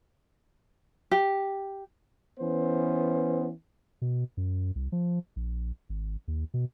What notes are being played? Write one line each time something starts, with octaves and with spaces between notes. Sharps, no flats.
G4
E3 B3 C#4 C5
B2
F#2
C2
F3
A#1
G#1
D#2
B2